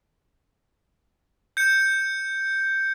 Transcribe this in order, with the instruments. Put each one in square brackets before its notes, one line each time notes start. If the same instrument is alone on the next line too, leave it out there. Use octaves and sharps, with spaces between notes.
[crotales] G6 C#7